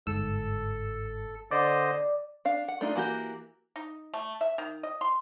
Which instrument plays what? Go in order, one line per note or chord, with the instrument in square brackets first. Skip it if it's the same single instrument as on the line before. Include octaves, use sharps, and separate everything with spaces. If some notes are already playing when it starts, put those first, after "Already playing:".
[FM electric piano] G1 G#2 E6 [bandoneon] A4
[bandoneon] D3 C5 D#5 [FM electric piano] D5
[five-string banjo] D4 F5
F#5
A3 D4 D#4 F4
E3 A#3 F#4 G4
[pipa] D#4
A3
E5
D#3
D#5
C6